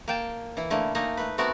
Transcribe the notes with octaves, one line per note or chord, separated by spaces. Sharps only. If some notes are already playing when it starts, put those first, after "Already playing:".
A#3 G5 A5
E3 E4
D3 A3 A#3
A3 A#3 D#4 G#5 A#5
A3 B4
A3 B3 C4 F#4 A#4